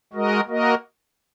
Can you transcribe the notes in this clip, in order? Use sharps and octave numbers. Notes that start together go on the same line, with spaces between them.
G#3 F#4 A#4 D#5
A#3 F#4 A#4 D#5